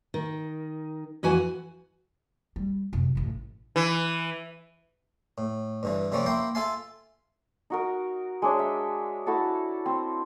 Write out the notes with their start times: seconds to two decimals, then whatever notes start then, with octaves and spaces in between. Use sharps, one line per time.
0.14 D#3
1.23 F2 E3 F#4 G#5
2.56 G3
2.93 F#2 C3
3.15 A1 G#2
3.76 E3
5.38 A2
5.83 G2 D3 E3
6.12 C3 F3 G3 A#3 C4 C#4
6.26 A#3 E4 G5 C6
6.55 F4 A4 E5 F5 G#5 C6
7.70 D#4 F#4 A#4
8.42 G#3 D4 C#5 E5
8.59 E5
9.26 E4 F#4 A4 A5
9.86 C4